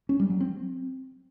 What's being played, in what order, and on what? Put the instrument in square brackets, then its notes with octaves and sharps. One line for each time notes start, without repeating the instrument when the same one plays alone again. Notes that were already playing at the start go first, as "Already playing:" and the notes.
[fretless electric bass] C#4
G3
F#3
C4